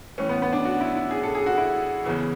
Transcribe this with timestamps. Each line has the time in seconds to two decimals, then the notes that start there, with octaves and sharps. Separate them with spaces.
0.18 A2 E3 C#4
0.29 B3
0.42 B3
0.53 D4
0.65 F#4
0.81 E4
0.96 E4
1.11 G#4
1.23 A4
1.35 G#4
1.46 F#4
1.57 E4
2.05 E2 C#3 E3